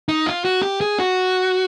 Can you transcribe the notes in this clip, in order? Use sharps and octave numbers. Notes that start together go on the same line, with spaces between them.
D#4
F4
F#4
G4
G#4
F#4